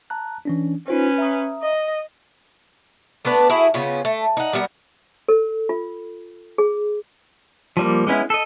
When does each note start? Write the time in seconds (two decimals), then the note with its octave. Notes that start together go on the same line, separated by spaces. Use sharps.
0.10 A5 A#5 F#6
0.45 E3 C#4 D4
0.88 C#4 D#4 F4 B4 C5
1.18 E5 A#5 D#6
1.62 D#5
3.25 A3 B3 D4 B4
3.50 E4 F#4 G#4
3.74 C#3 B3 C#4 F4
4.05 A3
4.37 D#4 F#5
4.53 G3 B3 F#4 A#4
5.28 A4
5.69 F4
6.58 G#4
7.77 F3 G3 A#3
8.07 G#3 B3 C#4 E4
8.30 A4 D#5